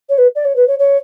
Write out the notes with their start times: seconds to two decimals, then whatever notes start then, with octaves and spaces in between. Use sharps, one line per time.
0.09 C#5
0.18 B4
0.35 D5
0.45 C#5
0.56 B4
0.67 C#5
0.79 C#5